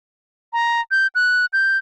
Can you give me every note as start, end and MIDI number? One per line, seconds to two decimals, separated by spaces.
0.53 0.81 82
0.91 1.07 91
1.15 1.46 90
1.53 1.78 91